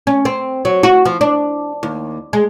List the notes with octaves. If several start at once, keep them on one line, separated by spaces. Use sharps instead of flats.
C#4
C4
F#3
F#4
F3
D4
D#2
G#3